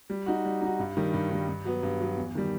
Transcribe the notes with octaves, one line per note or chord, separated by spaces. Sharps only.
G3
D#4 F#4
G3
D#4 F#4
G2
D#3 G3
G2
D#3 G3
G2
F#3 B3
G2
F#3 B3
E2
D#3 G3